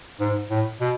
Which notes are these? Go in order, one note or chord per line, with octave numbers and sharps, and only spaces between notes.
G#2
A2
B2